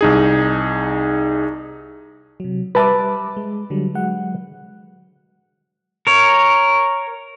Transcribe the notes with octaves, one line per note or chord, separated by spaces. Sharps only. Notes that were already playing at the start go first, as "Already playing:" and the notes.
C2 D#4 G#4
C3 F#3
G3 B4 E5 A5 D6
G#3
D3 F#3 G3
F#3 G#3 F#5
A#4 C#5